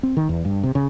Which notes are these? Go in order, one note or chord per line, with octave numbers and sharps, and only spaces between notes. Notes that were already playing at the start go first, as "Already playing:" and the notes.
C4
D#3
E2
G2
C3
C#3